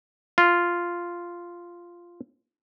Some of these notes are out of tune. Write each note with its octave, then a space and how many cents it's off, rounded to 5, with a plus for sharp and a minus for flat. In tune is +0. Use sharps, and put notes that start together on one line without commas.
F4 -5